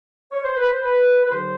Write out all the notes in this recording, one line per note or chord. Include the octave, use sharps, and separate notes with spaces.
C#5
C5
B4
C5
B4
B4
D#2 D3 F#3 C5